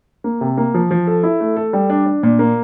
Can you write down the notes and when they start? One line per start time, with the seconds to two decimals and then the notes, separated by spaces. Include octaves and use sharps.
0.24 A#3
0.41 C3
0.57 A#3
0.74 F3
0.91 F3
1.07 A4
1.23 E4
1.41 A3
1.56 A4
1.73 G3
1.90 D4
2.06 D4
2.23 A#2
2.39 A#3